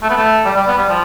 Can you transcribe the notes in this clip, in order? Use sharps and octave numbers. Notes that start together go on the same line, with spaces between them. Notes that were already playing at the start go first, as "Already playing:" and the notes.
A3
B3
A3
G3
G3
B3
G3
F3